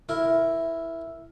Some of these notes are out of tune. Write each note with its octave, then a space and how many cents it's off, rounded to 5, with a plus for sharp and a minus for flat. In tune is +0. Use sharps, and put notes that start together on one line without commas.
E4 +0 A#4 +0